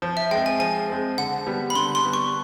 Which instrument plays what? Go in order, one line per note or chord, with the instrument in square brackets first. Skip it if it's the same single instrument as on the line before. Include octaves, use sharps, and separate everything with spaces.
[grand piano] F3
[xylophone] E5
[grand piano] G#3 C4 [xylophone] G5
[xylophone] G#5
[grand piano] F3 [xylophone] G#5
[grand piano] G#3 C4
[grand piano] D3 [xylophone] F#5
[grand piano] G3 B3
[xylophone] B5
[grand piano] D3 [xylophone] C6
[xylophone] C6
[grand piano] G3 B3
[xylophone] C#6